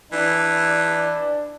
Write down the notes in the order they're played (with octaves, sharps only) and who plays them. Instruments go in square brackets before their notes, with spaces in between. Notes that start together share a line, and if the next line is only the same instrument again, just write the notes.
[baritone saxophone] E3 [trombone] D4